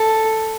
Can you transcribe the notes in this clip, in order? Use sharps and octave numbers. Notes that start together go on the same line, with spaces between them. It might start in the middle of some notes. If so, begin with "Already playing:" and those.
Already playing: A4